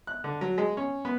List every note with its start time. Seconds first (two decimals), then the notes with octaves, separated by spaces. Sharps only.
0.07 F#6
0.24 D3
0.41 F#3
0.58 G#3
0.77 C#4
1.05 B3